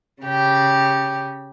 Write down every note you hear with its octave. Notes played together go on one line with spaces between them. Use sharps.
C#3 G4